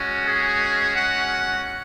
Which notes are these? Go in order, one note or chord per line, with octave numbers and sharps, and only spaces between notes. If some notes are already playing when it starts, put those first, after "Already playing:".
Already playing: G#3 C#4 F#4
G#4
F#5